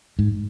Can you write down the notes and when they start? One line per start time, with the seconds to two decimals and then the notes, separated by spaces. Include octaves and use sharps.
0.19 G#2